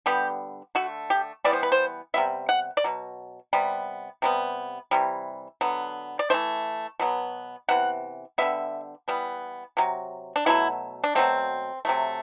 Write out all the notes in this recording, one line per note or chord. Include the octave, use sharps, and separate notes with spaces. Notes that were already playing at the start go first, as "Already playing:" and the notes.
D3 G3 B3 G4
D3 A3 F#4
G4
E3 G3 B3 D5
C5
B4
C5
C3 G3 B3 E5
F#5
D5
B2 F#3
C3 G3 B3
C3 G3 B3
C3 E3 G3
D3 F#3 B3
D5
E3 A3 C5
B2 F#3 B3
C3 E3 B3 F#5
D3 G3 B3 E5
E3 G3 B3
C3 F#3
D4
B2 F#3 A3 E4
D4
B2 F#3 A3 C4
C3 F#3 A3